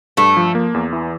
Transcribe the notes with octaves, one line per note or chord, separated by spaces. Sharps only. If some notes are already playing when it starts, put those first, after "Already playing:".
G2 A3
F3
A#3
E2
E3